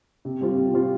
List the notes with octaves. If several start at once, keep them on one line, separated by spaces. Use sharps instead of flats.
C3
G3 C4 F4
C3
G3 C4 F4